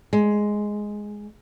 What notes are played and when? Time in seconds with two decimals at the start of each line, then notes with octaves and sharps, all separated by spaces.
0.13 G#3